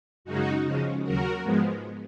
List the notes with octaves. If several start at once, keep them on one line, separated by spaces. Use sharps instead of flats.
F#2 C#3 G#3 C#4 D#4 F#4
C#3 F3 G#3 C#4
D#2 C#3 F#3 F#4 A#4
G#2 F3 G#3 B3